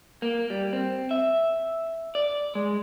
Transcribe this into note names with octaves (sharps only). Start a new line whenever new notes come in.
A#3
G3
C4
E5
D5
G#3